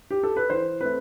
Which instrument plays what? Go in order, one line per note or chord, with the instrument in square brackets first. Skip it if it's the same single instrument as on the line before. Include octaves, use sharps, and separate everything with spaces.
[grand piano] G4
A4
B4
E3 C5
A3 C4 B4